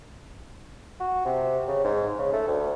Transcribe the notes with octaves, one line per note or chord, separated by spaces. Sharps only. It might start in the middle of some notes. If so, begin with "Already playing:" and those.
F#4
C3
C#3
G#2
C#3
A3
D2